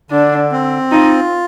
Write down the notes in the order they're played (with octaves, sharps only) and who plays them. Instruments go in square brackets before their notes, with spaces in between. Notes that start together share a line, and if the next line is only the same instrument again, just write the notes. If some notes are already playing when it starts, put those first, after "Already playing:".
[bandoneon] D3 [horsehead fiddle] D4
[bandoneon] C4
[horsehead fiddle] D#4 [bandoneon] F4